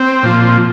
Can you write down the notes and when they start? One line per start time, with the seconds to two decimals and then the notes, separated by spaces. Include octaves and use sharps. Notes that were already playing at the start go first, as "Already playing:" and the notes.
Already playing: C4
0.23 A#2 F3